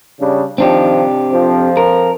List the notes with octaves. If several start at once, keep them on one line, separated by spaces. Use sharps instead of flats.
C#3 G3 D4
D#3 F3 C4 D4 G4
F2 F3
A#4